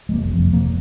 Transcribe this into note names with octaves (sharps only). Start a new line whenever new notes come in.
G#3
F1 A#3
F2 C3
F1 A#3